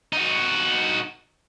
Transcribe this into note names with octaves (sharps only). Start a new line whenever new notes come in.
D#4 F#4